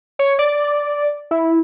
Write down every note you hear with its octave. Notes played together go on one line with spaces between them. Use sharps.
C#5
D5
E4